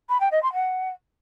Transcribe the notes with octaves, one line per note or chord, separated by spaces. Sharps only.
B5
G5
D#5
C6
F#5